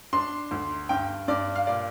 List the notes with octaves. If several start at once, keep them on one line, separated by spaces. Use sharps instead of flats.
D4 C6
D2
G2 G5
G2 D5
F5
A#2 D5